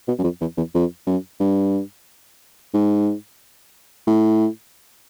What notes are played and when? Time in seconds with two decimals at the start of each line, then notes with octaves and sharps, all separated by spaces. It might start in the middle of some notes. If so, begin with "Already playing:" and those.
0.08 B2
0.18 F#2
0.24 F2
0.41 E2
0.57 E2
0.75 F2
1.07 F#2
1.40 G2
2.74 G#2
4.07 A2